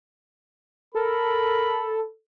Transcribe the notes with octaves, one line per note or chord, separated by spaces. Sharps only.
A4 A#4 B5